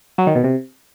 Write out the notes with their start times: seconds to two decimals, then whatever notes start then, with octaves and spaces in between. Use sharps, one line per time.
0.18 F#3
0.27 D#3
0.35 B2
0.44 C3